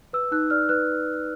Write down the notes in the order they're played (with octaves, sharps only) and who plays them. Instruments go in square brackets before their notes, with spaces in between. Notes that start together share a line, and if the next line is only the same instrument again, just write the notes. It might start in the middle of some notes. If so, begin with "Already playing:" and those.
[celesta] B4 E6
D#4 F#6
D5 F6
B4 F#6